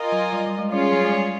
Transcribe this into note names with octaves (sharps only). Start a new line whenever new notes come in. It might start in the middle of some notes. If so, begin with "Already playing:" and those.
Already playing: F4 A#4 D#5 G#5
F#3
G3
G3
G#3
G3 C#4 F4 G#4 C#5
G3
F#3
G#3
G3